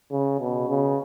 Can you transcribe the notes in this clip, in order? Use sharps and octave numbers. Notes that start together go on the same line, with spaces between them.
C#3
B2
C#3